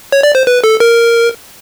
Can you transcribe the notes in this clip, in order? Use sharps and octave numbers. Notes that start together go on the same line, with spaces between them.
C#5
D5
C5
B4
A4
A#4